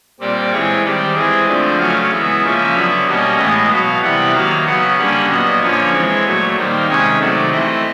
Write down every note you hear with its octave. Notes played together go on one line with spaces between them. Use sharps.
A#2 G3 C4 D5
E3 G#3 C4 C#5
D#3 G3 C4 D5
E3 G#3 C4 G#4
D3 F3 A3 C4 D5
C#3 F#3 A3 C#4 F5
E3 G#3 B3 E5
C#3 F3 A#3 C#4
D3 F#3 B3
B2 G3 A#3 C#4 D#5
A2 E3 G#3 B3 D#5
B2 F#3 B3 F5
C3 E3 G3 B3 F#5
D#3 F#3 A#3 F5
C#3 F#3 B3 F#5
D3 G3 A#3 C#4 F#5
A#2 F#3 B3 D#5
D3 F3 A#3 C#4 C#5
E3 G#3 C4
A#2 F#3 A3
D#3 G3 A#3 C5
C3 D#3 G#3 C#4 C#5
C3 D#3 F#3 A3 D5
E3 A3 C4 D#5